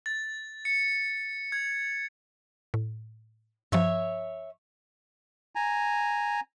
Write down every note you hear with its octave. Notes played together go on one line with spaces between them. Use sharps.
A6
C#7
G#6
A2
G2 F3 C#5 E5
G#5 A#5